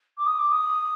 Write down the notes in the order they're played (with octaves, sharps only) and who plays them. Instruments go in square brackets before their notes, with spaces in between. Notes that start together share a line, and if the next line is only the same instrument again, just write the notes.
[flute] D6
D#6
D6
D#6